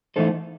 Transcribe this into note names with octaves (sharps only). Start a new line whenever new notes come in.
E3 A3 D#4 A4 C5